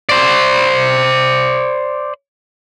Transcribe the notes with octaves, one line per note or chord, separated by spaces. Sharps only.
C5 D5